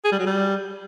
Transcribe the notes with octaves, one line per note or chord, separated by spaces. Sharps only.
G#4
G3
F#3
G3